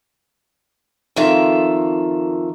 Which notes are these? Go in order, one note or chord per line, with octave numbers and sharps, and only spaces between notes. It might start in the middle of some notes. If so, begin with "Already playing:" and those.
F2 D#3 F4 A4 E5 A#5